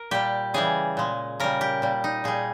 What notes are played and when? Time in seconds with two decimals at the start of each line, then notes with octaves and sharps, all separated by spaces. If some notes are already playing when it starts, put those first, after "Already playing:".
Already playing: A#4
0.11 A#2 G3 G4
0.54 C#3 E3 G3 G#4
0.97 A#2 G#3
1.40 C#3 G3 A#4
1.61 G4
1.82 A#2 G3
2.04 D#4
2.24 A#2 G3 G#4